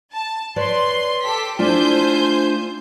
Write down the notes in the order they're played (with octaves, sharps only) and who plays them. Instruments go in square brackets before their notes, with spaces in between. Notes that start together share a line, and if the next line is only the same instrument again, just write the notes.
[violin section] A5
[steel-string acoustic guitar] B4 C#5 D5 [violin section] C6
[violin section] G4 A4 B6
[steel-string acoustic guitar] A3 D4 F4 [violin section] C5 G#5 G6